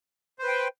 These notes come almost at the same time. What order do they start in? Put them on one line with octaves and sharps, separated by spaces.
C5 B4 G5